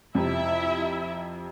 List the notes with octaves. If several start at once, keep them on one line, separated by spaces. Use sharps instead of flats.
F2 C3 E4 E5